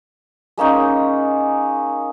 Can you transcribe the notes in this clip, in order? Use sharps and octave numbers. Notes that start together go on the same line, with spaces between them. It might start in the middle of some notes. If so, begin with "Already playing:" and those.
G#3 A#3 C#4 D#4